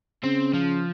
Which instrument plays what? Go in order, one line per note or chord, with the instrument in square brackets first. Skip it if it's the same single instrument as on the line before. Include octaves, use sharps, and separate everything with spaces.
[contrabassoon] C#3 [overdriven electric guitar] C4
[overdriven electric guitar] F3